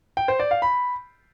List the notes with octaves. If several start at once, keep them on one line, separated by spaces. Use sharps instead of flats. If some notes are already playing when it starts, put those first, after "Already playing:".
G5
C5
D5
F5
B5